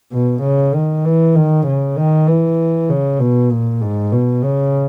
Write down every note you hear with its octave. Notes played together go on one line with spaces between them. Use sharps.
B2
C#3
D#3
E3
D#3
C#3
D#3
E3
C#3
B2
A#2
G#2
B2
C#3